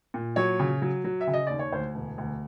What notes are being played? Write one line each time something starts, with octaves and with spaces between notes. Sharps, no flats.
A#2
F#3 C#5
C#3
F#3
F#3
E5
C#3
D#5
D#2 D5
C#5
D2 C5
E1
D2